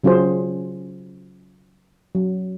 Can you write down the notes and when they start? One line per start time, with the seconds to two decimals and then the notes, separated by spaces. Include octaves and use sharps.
0.04 C#3 F#3 C#4 F4 G#4 C5
2.15 F#3